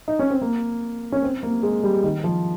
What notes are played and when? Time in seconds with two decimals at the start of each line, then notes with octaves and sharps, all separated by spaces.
0.08 D#4
0.19 C#4
0.30 C4
0.42 A#3
1.12 C#4
1.23 C4
1.43 A#3
1.63 G#3
1.84 G3
2.04 D#3
2.24 F3